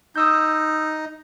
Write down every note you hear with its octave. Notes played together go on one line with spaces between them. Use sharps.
D#4 D#6 E6 G6